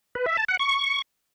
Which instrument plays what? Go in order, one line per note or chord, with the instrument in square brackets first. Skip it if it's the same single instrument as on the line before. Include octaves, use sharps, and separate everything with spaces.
[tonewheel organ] B4
E5
A5
F#5
C#6